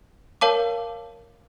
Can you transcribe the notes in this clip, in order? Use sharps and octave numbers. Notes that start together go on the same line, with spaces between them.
A#4 C#5 F5 A5 D6